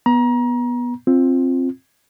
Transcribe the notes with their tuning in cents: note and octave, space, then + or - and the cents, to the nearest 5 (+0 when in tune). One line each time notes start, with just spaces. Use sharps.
B3 -15 A#5 +30
C4 +15 F4 +0